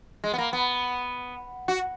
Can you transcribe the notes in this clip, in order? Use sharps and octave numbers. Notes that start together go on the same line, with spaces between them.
G#3
B3
A#3
B3
F#4